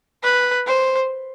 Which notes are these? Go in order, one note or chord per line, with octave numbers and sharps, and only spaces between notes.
B4
C5